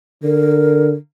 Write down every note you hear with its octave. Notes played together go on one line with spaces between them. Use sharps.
D3 A#4